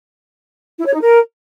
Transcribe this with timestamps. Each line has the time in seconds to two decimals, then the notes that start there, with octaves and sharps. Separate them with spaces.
0.78 E4
0.86 C#5
0.93 D#4
1.01 A#4